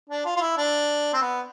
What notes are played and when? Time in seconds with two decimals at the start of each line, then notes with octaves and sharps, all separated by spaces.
0.10 D4
0.25 F4
0.37 F4
0.41 E4
0.57 D4
1.14 C4
1.21 B3